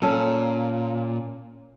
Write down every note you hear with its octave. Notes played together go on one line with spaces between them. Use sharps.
A#2 C#4 A4